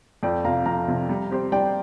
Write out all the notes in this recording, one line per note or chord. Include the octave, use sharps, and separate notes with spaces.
F2 D5 G5
C3 F3 F5 A#5
F2 F5 A#5
C3 F3
G3
C4 G4 C5
G3 D5 G5